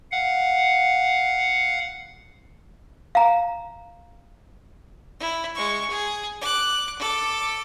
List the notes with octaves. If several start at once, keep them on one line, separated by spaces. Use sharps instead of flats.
F5 F#5
F5 A#5
E4
G#3 C#6
G#4
D6 F#6
A4 D6